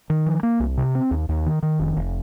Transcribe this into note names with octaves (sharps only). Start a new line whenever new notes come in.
D#3
F3
A#3
C2
C3
C4
D#2
D#2
D#3
D#3
F1
F1